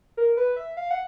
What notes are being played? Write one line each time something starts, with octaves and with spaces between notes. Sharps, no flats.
A#4
B4
E5
F5
F#5